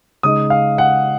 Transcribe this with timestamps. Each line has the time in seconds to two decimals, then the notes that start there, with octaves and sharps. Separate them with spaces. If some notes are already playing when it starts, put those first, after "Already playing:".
0.23 C#3 G#3 D#4 D#6
0.50 F5
0.78 F#5